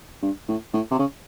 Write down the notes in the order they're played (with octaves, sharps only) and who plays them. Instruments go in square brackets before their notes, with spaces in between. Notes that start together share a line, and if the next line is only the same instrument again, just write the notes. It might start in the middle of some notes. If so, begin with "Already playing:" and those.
[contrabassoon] G2
A2
A2
C3
C#3